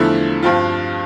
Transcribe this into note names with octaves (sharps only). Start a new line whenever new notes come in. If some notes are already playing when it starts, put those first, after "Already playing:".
Already playing: E2 D3 F3 A3 E4
G2 F3 C4 F4